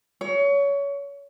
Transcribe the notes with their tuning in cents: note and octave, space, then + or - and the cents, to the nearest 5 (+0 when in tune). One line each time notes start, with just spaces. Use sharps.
C#5 +25